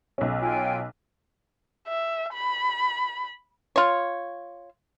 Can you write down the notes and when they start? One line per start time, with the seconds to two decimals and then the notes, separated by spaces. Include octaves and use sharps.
0.18 B1 C#4
0.40 F4 G5 G#5
1.88 E5
2.34 B5
3.76 F4 C#5